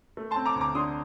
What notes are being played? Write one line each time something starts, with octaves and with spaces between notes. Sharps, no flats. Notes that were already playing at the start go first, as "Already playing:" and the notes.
A3
A5 C6
C4
A#5 D6
D2
A#5 D6
D3 C6 D#6